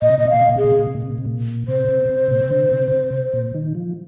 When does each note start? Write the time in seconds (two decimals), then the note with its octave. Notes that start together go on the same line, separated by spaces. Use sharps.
0.02 A#2 D#5
0.10 C3
0.18 A#2 D#5
0.25 C3
0.30 A#2 F5
0.41 C3
0.48 A#2
0.56 C3 G#4
0.64 A#2
0.72 C3
0.79 A#2
0.87 C3
0.95 A#2
1.02 C3
1.10 A#2
1.18 C3
1.25 A#2
1.68 C3 C5
1.89 C3
2.09 C3
2.31 A#2
2.41 C3
2.50 D3
2.72 C3
2.92 C3
3.33 A#2
3.54 D#3
3.75 F3